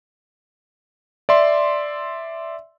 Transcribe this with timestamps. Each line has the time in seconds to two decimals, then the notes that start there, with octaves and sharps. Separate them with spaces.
1.29 D5 E5 C6